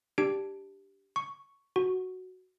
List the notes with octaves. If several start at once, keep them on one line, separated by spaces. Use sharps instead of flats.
D4 G4 D7
C#6
F#4